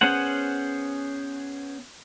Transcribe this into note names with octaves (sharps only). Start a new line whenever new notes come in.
B3 C#4 G#4 C5 F#5